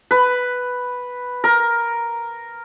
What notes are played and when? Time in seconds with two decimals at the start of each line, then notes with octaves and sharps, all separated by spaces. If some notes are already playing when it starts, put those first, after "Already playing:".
0.11 B4
1.44 A#4